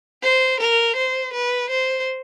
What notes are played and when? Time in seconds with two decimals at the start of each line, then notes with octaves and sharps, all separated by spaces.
0.23 C5
0.60 A#4
0.96 C5
1.34 B4
1.70 C5